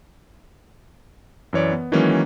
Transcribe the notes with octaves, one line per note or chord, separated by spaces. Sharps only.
F#2 E3 C#5 D5
B3
D#3 E3 F#3 G#3 A#3 C#4